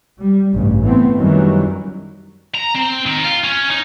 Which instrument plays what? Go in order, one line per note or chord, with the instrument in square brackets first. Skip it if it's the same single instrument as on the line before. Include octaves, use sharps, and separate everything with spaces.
[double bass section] G3
A1 G2 C#3
E3 A3 B3 C4
F#2 D#3 E3 F#3 G3
[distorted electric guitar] A#5
C4
D#3
F4
C#4
D#4